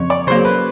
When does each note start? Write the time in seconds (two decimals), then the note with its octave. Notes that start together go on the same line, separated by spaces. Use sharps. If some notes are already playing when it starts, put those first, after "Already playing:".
Already playing: F2 C#3 C#5
0.10 D5
0.27 C#3 F#3 A#3 C5
0.45 B4